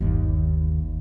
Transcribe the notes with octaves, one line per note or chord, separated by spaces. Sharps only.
G1 D#2